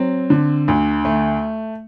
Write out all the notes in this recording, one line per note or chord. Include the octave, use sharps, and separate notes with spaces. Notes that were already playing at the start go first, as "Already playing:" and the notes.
Already playing: F#3 C4
D3
D2
A3